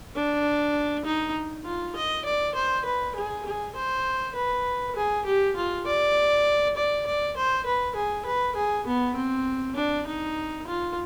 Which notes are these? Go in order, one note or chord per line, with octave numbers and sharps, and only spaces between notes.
D4
D#4
F4
D#5
D5
C5
B4
G#4
G#4
C5
B4
G#4
G4
F4
D5
D5
D5
C5
B4
G#4
B4
G#4
B3
C4
D4
D#4
F4